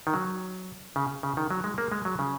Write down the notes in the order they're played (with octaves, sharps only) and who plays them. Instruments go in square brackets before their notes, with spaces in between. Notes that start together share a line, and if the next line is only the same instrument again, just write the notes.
[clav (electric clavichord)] D#3
F#3
C#3
C#3
D#3
F#3
G#3
A#3
G#3
F#3
C#3